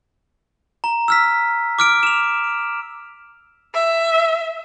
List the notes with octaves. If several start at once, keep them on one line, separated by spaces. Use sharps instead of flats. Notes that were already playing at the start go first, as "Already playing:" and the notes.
A#5
E6 F6 B6
D6 F6 D7
E7 F7
E5